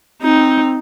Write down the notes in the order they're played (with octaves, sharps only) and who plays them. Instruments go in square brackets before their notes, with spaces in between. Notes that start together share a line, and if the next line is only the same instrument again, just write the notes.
[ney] C4 [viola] D#4